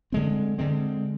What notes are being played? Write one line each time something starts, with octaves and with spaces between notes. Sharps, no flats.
D3 G#3 C4
D3 G#3 C4